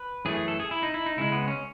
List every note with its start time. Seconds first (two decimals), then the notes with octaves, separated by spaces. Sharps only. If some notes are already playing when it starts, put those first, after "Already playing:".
Already playing: B4
0.25 F#2 E3 A3 G#4
0.36 G#4
0.48 A4
0.60 G#4
0.71 E4
0.83 D#4
0.94 E4
1.06 D#4
1.17 C#2 C#3 G#3 E4
1.32 B3
1.48 C#4